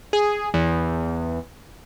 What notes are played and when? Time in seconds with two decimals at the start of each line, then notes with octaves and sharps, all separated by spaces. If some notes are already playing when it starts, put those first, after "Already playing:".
0.13 G#4
0.54 E2